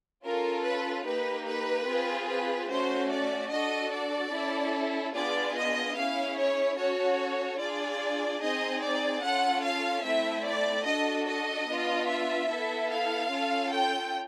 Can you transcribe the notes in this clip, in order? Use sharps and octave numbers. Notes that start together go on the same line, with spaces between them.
C#4 F4 A4 A#4
B4
A#3 D#4 G4 B4
B4
C4 F4 G#4
B4
A3 C#4 F#4 C5
D5
D4 F#4 A4 D#5
D5
C#4 E4 A4
B3 D4 F4 G#4 D5
D#5
C#4 E4 G#4 F5
C#5
C#4 F#4 A4 C#5
D4 F4 G#4 D5
C4 D#4 G#4 D#5
D5
C#4 F4 A4 F#5
F5
A3 C4 E4 E5
D5
D4 F#4 A4 D#5
D#5
B3 D4 F4
E5
B3 E4 A4
F5
C#4 F4 A4
G5